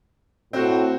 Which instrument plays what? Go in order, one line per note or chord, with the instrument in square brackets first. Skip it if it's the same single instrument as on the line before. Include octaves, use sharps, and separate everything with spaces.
[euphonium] A2 [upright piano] C4 F#4